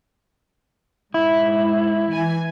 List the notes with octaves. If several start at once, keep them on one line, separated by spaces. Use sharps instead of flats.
G#2 E4
E3 G#5